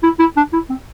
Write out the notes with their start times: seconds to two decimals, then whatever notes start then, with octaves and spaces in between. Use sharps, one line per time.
0.03 E4
0.19 E4
0.37 D4
0.53 E4
0.70 C4